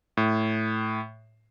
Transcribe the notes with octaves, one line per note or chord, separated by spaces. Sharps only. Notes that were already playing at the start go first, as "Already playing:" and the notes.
A2